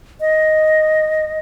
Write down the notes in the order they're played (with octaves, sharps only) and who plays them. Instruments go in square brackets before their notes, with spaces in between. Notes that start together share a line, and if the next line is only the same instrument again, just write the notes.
[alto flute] D#5